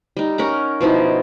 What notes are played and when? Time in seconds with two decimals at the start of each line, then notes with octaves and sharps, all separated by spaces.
0.17 G3 D#4
0.38 C#4 A#4 F#5 A#5
0.81 B2 F3 D#4 E4